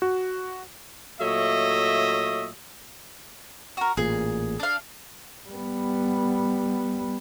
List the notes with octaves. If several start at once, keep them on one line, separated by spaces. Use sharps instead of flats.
F#4
A#2 F#3 A3 C#5 D#5 E5
F#4 A#4
A1 A#2 G#4
D4 F5
G3 B3